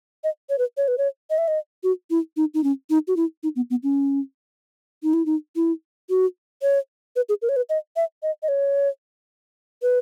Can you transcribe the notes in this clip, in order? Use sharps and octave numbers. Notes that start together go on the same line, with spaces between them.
D#5
C#5
B4
C#5
B4
C#5
D#5
E5
D#5
F#4
E4
D#4
D#4
C#4
D#4
F#4
E4
D#4
B3
B3
C#4
D#4
E4
D#4
E4
F#4
C#5
B4
G#4
A#4
C#5
B4
D#5
E5
D#5
D#5
C#5
B4